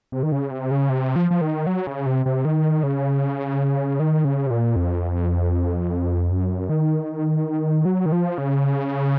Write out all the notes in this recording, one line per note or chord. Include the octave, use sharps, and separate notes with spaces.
C3
D#3
C#3
C3
C#3
C3
F3
F3
D#3
F#3
C#3
C3
C3
D#3
C#3
D#3
C#3
C3
A#2
F2
F#2
D#3
F#3
D#3
F3
C#3